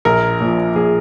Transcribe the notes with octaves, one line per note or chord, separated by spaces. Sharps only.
A#1 A#4
A#2 F3
A#1 G#4